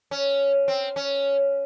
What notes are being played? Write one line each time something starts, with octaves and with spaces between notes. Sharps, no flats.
C#4
C4
C#4